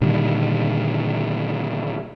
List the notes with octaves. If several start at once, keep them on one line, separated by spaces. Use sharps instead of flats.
A#2 D3 D#3 G3